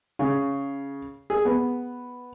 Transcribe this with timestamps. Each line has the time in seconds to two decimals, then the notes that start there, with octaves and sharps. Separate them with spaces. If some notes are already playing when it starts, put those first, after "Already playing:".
0.19 C#3
1.30 G#4
1.45 B3